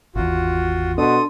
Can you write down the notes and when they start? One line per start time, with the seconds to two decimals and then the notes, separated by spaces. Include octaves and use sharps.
0.15 G#1 E2 F4 F#4
0.98 B2 D4 A4 C6 D#6